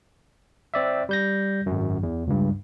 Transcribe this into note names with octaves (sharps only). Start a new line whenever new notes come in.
C4 D5 E5
G3 G6 A#6
G#1 F#2
E2
C#2 G2